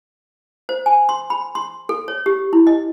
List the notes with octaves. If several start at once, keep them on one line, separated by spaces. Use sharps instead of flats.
C5
G#5
C6
B5
C6
A4
C#5
G4
E4
D#5